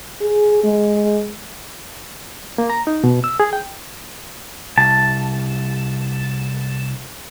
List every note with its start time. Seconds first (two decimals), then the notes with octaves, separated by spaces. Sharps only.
0.21 G#4
0.64 G#3
2.58 A#3
2.70 A#5
2.87 D#4
3.04 B2
3.24 E6
3.40 G#4
3.53 G5
4.78 C2 A5